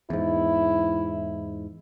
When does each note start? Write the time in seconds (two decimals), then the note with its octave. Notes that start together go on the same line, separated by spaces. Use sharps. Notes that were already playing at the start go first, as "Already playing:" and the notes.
0.10 E2 G#2 E4